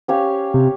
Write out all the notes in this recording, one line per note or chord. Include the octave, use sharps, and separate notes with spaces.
C#4 G4 C#5 F5
C3